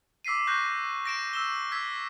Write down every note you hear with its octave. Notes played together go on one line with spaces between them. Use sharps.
D6 E6 B6 C7 D#7
C#6 F#6 G6 A#6
A#6 D7 E7
E6 E7 G7
E6 G#6 B6